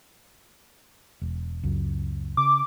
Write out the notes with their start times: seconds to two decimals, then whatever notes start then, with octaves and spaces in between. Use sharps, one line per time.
1.22 E1
1.63 C#2 F#2
2.37 C#3 D6